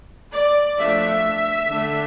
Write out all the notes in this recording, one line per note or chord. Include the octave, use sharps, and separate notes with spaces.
D5
F3 A3 D4 E5
D3 A3 D4